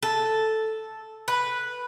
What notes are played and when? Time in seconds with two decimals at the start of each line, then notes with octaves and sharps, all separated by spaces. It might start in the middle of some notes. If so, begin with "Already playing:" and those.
0.03 A4
1.28 B4